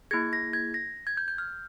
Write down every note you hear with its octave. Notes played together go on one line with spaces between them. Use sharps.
A#3 E4 G#4 G#6
A#6
G#6
A#6
G#6
G6
G6
F6